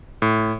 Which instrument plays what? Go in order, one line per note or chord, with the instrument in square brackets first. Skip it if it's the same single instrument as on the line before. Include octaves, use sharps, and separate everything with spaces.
[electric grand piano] A2